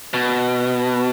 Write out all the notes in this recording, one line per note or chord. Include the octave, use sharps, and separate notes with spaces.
B2